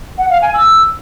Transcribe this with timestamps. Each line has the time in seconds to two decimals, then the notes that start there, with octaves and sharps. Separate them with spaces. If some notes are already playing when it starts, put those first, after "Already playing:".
0.18 F#5
0.30 F5
0.42 G#5
0.54 E6